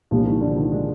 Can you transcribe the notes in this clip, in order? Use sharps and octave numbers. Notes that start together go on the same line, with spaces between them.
C2 A#2 F3 G3 D4 G4
D#3
D3
D#3
G#3